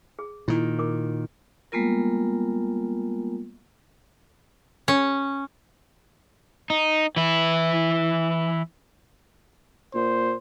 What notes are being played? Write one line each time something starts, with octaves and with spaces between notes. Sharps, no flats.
G#4
A#2 D#3 E4
A#4 D6
G3 G#3 A#3 B3 F4 A#4
C#4
D#4
E3 E4
A#2 C5